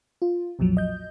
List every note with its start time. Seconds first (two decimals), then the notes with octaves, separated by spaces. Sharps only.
0.22 F4
0.59 B1 F2 A#2 F3 F#3
0.77 D#5 G6